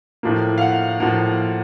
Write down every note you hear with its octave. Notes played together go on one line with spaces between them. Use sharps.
A2 F3 A#3
F5
F#5
A2 F3 A#3 F#5